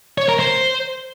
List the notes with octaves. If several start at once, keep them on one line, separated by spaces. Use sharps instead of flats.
C#5
A#4
C5